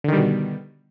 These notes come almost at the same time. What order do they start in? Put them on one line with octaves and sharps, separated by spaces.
D3 D#3 G3 B2